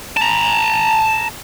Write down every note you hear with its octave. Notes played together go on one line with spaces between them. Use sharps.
A5 A#5